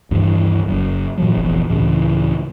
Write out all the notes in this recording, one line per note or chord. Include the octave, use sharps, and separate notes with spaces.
D2 G2 D#3 E3
F#1 F#2
A#2 E3 F#3
F1 A#1 E2
C#2 A2 C#3 E3